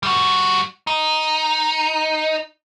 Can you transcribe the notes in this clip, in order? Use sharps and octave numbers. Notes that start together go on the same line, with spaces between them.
G3 F#4
D#4